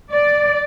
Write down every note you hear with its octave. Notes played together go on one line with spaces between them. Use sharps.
D5